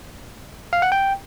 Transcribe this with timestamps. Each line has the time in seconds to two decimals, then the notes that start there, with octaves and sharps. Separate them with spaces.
0.73 F5
0.82 F#5
0.92 G5